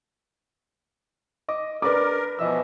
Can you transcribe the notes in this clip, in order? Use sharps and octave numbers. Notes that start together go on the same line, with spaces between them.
D#5 D6 D#6
D4 A#4 B4 D5 D6
B2 E3 F3 D#5 E5 E6